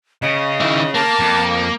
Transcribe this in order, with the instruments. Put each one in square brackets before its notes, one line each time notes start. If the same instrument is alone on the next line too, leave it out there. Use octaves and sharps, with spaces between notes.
[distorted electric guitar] C#3 [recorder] D#5
[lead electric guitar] D#3 E4
[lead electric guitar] A#3 [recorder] A5
[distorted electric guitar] F2